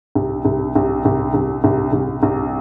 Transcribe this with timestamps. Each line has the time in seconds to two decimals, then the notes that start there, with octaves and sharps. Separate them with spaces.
0.15 C2
0.45 C2
0.75 C2
1.05 C2
1.34 C2
1.64 C2
1.93 C2
2.23 C2